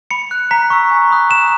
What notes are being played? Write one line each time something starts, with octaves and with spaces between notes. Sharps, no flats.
B5 C#7
F#6
A#5 B6
C#6 E6
G#5
B5 D#6 F#6
A#5 E7